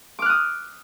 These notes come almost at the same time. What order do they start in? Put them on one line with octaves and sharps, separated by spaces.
D6 F6 F#6 D#6